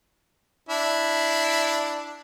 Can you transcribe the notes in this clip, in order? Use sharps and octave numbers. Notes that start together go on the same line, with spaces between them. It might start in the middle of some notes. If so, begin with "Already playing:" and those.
D4 E4